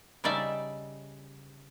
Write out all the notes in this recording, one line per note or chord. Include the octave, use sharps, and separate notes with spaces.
C#3 G3 D#4 D5 E5 A5